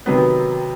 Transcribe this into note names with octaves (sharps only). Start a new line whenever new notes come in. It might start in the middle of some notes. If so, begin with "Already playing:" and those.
C3 D#3 F#3 B3